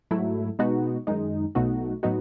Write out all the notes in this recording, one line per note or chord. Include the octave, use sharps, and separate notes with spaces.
G#2 F#3 A3 E4
B2 G#3 B3 D#4 F#4
F#2 D#3 G#3 D#4
B1 B2 A3 D#4 F#4
A2 F#3 B3 D#4 F#4